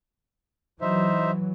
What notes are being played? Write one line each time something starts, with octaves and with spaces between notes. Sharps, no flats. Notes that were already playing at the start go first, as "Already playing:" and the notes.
E3 F#3 D#4 C5 E5